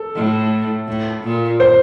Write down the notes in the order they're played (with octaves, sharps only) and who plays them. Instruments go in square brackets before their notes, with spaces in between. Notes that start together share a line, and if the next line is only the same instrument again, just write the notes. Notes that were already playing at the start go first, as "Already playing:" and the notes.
Already playing: [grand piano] A4
[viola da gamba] A2
A2
A#2
[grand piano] C5